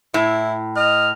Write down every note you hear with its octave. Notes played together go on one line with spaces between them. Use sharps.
A2 E4
D#5 F6